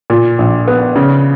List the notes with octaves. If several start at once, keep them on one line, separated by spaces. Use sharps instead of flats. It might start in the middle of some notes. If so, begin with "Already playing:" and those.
A#2
A#1
B3
C#3